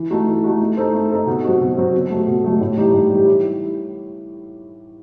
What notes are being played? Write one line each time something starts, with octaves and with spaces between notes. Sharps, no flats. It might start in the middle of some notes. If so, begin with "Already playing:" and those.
Already playing: E3
A3 D#4 F#4
E3
A3 D#4 F#4
A3
D#4 A4 C5
A3
D#4 A4 C5
B2
F#3 C4 F#4
B2
F#3 C4 F#4
B2
F#3 A3
B2
F#3 A3
A2
E3 G3 D#4 G4
A2
E3 G3 D#4 G4
E3